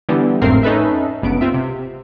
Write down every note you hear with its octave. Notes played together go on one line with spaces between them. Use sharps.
D3 E3 G3 B3
G#1 F2 A2 C4 A#4 C7
C#4 D#4 A4 B4 E5
G1 C#2 B3 D7
C4 F4 E5
C3